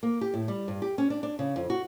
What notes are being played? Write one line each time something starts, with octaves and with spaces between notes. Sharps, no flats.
A#3
G4
A2
G3
G2
G4
C#4
D4
D4
C#3
F2
F#4